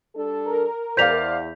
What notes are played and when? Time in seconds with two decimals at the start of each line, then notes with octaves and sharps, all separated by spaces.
0.16 G3 D4 A4
0.46 A#4
0.97 E2 C5 D5 F5 G6 B6 F7